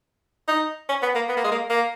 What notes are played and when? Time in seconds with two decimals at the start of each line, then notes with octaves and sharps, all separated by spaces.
0.48 D#4
0.89 C#4
1.02 B3
1.15 A#3
1.29 B3
1.37 A#3
1.44 G#3
1.52 A#3
1.70 A#3